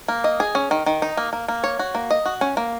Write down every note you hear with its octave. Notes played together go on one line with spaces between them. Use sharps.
A#3
D#5
G#4
C#4
D#3
D#3
D#4
A#3
A#3
A#3
C#5
F#4
A#3
D#5
F#4
C#4
A#3